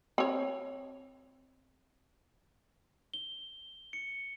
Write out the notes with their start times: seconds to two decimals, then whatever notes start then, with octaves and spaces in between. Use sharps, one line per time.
0.18 C4 C#5
3.14 G7
3.93 C#7